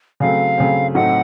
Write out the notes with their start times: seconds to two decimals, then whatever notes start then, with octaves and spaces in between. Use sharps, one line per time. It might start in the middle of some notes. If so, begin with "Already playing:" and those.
0.20 C#3 F#3 A3 C4 F5
0.58 C#3 F#3 A3 C4
0.94 A2 F#3 A3 C4 D#4 F#5